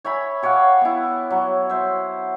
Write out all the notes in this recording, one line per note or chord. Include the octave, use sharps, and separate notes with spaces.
C#5 E5 G#5 B5
G4 C#5 F5 F#5
B3 E4
F#3
C5 E5